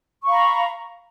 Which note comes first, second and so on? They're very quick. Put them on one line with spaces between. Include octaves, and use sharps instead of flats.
C#6 F5 B5 A#5